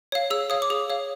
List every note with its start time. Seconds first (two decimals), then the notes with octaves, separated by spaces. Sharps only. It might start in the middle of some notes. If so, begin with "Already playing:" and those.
0.12 C#5 F5
0.30 G#4 E6
0.50 C#5 F5 D#6
0.62 D6
0.70 G#4 D#6
0.90 C#5 F5